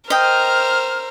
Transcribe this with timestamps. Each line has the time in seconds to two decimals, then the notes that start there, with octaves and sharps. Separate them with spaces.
0.10 A#4 C5 D#5 G5 F6